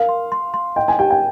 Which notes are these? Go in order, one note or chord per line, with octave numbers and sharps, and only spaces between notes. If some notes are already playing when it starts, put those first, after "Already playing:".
Already playing: A#4 F5
C6
C6
C6
D#5 G5
G#5
G4 G5
G5